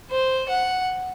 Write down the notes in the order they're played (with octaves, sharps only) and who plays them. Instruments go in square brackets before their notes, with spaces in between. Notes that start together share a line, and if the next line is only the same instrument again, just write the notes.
[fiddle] C5
F#5